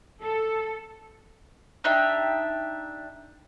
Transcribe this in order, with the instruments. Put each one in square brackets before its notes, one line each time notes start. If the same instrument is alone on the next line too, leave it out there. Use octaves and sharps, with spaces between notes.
[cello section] A4
[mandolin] D4 D#4 G4 E5